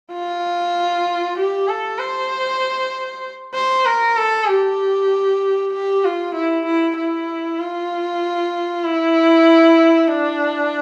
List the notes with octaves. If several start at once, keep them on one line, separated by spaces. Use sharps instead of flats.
F4
G4
A4
C5
C5
A#4
A4
G4
G4
F4
E4
E4
E4
F4
E4
D4